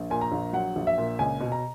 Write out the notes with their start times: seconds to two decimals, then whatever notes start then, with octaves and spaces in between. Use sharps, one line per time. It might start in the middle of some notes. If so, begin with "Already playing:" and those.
Already playing: A#1
0.10 A#2 G#5
0.21 A#5
0.32 A#1
0.53 F#3 F#5
0.76 A#1
0.87 E5
0.98 A#2
1.19 C#2 G#5
1.40 B2
1.52 A#5